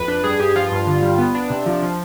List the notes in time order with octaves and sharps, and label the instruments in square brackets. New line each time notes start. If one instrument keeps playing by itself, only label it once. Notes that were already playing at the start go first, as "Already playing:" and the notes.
Already playing: [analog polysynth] F2 B4
D4
G2 G#4
G2 G4
F3 F4
G2
D3
G3
B3
D4
C3
F3
F3